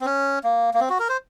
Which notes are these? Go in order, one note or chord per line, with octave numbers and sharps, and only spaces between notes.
C4
C#4
A#3
A#3
C4
F#4
A#4
C5